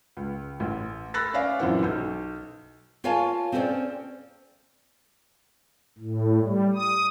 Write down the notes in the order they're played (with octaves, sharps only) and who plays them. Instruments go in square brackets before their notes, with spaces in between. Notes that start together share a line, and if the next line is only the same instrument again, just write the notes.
[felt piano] C#2
A1
B5 E6 F#6 A6 A#6
C#4 D5 E5 F5
F#2 A#2 E3 C4 F#5
B1 G6
[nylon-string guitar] F4 A#4 C#5 F5 G#5 A5
C4 C#4 A4 B4 C5 D5
[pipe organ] A2
G3
D#6